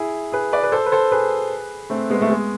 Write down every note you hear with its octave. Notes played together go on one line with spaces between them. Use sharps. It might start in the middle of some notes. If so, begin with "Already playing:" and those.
Already playing: E4 G#4
G#4 B4
B4 D5
B4
A4 C5
B4
A4 C5
G#4 B4
A3 C4
G#3 B3
A3
G#3 B3